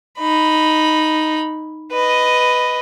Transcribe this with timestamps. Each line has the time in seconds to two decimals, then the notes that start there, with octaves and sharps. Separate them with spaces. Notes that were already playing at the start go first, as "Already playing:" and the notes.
0.18 D#4 B5
1.92 B4 D#5